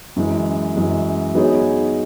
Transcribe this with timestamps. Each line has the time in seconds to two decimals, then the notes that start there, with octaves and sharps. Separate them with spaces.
0.16 F#2 E3 G#3
0.76 F#2 E3 G#3
1.35 F#3 B3 D#4 G#4 C#5